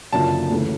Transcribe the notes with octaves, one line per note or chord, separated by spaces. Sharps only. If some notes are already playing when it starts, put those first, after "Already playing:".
F#1 F#2 D3 F3 A5
D2 C#3 E3 A3